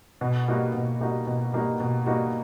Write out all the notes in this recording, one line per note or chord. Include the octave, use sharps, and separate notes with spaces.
B2
G3 A#3 D#4 F#4
B2
G3 A#3 D#4 F#4
B2
G3 A#3 D#4 F#4
B2
G3 A#3 D#4 F#4